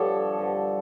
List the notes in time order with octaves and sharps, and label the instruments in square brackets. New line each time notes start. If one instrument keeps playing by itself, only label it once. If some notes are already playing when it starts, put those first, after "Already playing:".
Already playing: [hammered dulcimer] G2 D3 F3 [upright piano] A4 C#5
[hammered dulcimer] G2 D3 F3